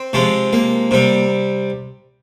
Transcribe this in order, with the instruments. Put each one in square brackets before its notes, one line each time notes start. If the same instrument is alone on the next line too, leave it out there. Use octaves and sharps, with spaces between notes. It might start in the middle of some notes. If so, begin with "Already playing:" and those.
Already playing: [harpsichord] C4
C3 F3 G#3
A#3
C3 G3